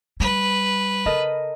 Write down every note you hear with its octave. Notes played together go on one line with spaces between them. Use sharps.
G3 B4
C#3 A4 A#4 D#5